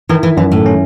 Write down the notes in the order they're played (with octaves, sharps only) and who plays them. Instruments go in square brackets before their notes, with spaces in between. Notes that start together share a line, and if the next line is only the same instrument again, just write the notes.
[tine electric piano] D#3 [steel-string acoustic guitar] E3
[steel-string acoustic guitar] E3
[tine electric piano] F#2 [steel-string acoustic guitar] E3
[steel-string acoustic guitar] A2
[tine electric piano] C#4